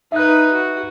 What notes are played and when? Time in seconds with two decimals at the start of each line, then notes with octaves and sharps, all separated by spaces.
0.12 D#4 B4 E5 F#6
0.52 F#4